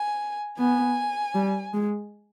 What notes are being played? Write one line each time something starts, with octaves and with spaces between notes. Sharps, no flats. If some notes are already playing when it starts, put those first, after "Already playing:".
Already playing: G#5
B3 G#5
G3
G#3